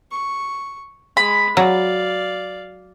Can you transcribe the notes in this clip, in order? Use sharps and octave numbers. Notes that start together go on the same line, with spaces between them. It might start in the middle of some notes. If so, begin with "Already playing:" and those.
C#6
G#3 B5
F#3 D5 F5